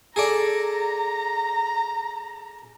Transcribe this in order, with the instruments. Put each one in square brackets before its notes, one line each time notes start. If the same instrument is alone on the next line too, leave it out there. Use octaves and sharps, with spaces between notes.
[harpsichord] G#4 A4 D5 [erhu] A#5